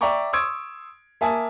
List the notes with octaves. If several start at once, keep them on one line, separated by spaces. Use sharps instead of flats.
D5 E5 G5 A#5 C#6 D6
C6 C#6 D#6 E6 G#6 D7
A#3 E5 G#5 A5 D#6